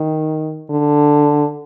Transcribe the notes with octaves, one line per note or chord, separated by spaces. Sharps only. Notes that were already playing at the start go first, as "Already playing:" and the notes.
Already playing: D#3
D3